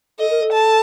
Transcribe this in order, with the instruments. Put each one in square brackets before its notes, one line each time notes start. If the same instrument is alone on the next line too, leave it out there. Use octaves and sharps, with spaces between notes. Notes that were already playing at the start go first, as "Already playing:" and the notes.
[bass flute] A4 [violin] D#5
[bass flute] A#4
A4
[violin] A5